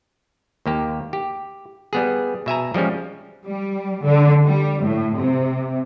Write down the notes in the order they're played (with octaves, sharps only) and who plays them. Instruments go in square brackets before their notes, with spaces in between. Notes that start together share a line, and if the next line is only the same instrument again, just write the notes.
[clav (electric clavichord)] D#2 A#3 G4
G4
G3 B3 G#4
B2 E5 G#5 A#5
F3 G3 G#3 C#4
[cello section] G3
D3
G3
A2
C3